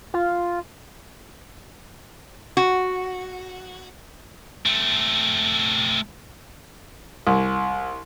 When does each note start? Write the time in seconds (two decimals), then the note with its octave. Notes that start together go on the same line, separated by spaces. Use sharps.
0.14 F4
2.57 F#4
4.66 A3 C4
7.27 C2